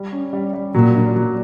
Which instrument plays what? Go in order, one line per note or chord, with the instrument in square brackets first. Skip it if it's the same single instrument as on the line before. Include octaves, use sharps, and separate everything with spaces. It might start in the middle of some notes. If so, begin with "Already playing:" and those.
Already playing: [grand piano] G3
C#4
G3
G3
[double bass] A#2 [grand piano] F#3
[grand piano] D4
F#3